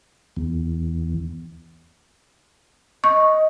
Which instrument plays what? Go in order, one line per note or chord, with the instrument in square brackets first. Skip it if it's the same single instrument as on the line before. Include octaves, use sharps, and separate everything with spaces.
[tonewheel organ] E2
[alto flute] D#5 [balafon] C#6